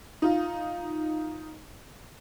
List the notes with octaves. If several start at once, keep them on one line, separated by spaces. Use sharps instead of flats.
D#4 F4